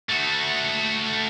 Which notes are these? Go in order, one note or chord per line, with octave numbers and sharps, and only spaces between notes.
A3 F#4